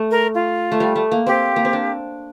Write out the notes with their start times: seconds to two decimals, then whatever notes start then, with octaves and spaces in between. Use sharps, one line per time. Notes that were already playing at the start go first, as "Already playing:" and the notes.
Already playing: A3
0.10 A#4
0.34 F4
0.72 A3
0.80 G3
0.96 A3
1.12 A#3
1.26 C4 G4
1.56 A#3
1.65 C4
1.73 D4